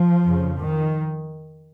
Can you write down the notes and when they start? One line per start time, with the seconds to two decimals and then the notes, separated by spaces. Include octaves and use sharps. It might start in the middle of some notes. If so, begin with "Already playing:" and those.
Already playing: F3
0.24 F2 C#3
0.60 D#3